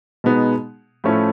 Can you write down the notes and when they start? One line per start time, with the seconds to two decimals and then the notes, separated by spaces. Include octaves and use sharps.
0.24 B2 G#3 B3 D#4
1.04 A2 F3 A3 C#4 E4